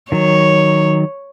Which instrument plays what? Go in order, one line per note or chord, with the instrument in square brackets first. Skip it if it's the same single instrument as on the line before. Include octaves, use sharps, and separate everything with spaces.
[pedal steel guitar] D#3 F#3 [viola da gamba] C#5